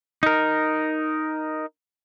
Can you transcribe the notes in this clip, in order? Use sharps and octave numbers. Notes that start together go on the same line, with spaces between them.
D#4 A#4